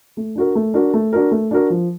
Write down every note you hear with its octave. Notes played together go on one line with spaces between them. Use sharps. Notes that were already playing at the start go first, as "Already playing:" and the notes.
A3
D4 F#4 A#4
A3
D4 F#4 A#4
A3
D4 F#4 A#4
A3
D4 F#4 A#4
F3